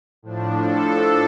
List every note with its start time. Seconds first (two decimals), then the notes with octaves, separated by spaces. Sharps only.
0.23 A2 F3 D4
0.61 A4